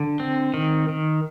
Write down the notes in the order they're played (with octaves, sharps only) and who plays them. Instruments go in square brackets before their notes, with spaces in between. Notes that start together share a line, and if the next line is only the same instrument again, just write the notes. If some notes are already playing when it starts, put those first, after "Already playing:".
Already playing: [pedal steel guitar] D3
C4
D#3
D#3